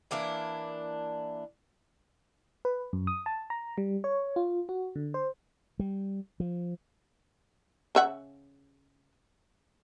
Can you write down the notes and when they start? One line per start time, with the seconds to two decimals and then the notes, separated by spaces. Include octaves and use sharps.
0.11 E3 A#3 D4 E4
2.65 B4
2.93 F#2
3.07 D#6
3.26 A5
3.50 A#5
3.78 G3
4.04 C#5
4.36 F4
4.69 F#4
4.96 D3
5.14 C5
5.79 G3
6.40 F3
7.95 C#3 E5 F#5